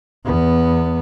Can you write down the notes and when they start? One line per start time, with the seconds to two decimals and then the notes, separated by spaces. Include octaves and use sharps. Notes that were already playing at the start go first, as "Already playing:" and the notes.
0.25 E2 B3